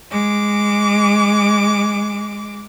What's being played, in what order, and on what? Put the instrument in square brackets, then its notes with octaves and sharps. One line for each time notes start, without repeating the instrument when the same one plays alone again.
[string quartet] G#3 D6